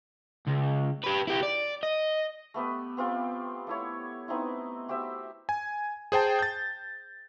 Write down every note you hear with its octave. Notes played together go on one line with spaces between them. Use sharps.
C#2
G4 B4
E4 G4
D5
D#5
A3 B3 G4 B4
B3 C4 F4 G4
A3 E4 C#5
B3 C4 D#4 E4
F#4 G4 C5 E5
G#5
G#4 C5 G5 A5
G6 A6